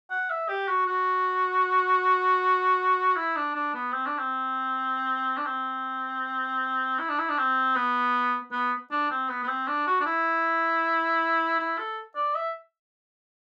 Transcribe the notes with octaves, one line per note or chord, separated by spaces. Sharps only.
F#5
E5
G4
F#4
F#4
E4
D4
D4
B3
C4
D4
C4
D4
C4
E4
D4
E4
D4
C4
B3
B3
D4
C4
B3
B3
C4
D4
F#4
D4
E4
E4
A4
D5
E5